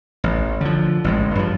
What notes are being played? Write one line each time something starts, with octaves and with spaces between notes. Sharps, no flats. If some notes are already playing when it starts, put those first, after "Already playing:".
A1
D3 F3
A1 A2 G#3
G2 F3